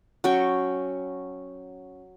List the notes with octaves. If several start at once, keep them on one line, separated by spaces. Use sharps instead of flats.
F#3 C#4 G5 C#6